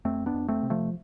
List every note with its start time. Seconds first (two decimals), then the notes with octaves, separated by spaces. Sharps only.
0.05 F2 A3 C4
0.26 B3 D4
0.34 F2
0.48 A3 C4
0.63 C3
0.70 F3 A3